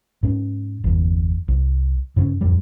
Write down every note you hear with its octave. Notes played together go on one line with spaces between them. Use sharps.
G#2 C#4
G1 E2
C2
G2 C#3 B3 C#4
D1 F2 G3